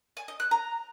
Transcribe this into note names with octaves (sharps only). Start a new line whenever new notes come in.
G#5
D#5
F#6
A#5